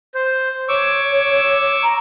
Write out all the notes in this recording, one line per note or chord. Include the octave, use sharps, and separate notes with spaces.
C5
C#5 C#6 D6 E6
A#5